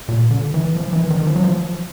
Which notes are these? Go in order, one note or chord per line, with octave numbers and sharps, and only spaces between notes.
A#2
D3
E3
F3
E3
D#3
F3
F#3
F3